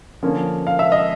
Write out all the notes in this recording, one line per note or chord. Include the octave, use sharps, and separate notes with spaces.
D3 F3 A#3 C#4
F5
E5
D#5